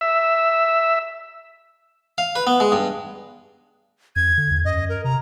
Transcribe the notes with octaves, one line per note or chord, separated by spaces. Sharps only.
E5
F5
B4
B3
G#3
G2
F2 G#6
D3
E2
F#2 D#5
A#4
C3 A#5